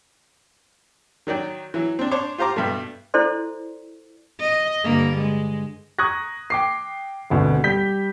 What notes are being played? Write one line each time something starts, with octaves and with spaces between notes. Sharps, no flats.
D#3 F#3 D5 G5
E3 F#3
C4 D4
D4 C5 C#5 C#6 D6
F4 G4 C5 A#5 D6
G2 B2 A3
E4 F4 A4 C5 D5 C6
D#5
G2 D3 A#3
G#3
A#5 C#6 D#6 F#6 G#6 A#6
G5 D6 C7
G#1 D2 B2
G3 G4 G6 B6